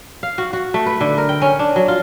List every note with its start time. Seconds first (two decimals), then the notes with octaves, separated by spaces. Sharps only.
0.23 F5
0.38 F#4
0.53 F#4
0.74 A3
0.86 B4
1.01 D3
1.18 A#4
1.29 G5
1.42 C#4
1.59 D4
1.76 F#3
1.88 F4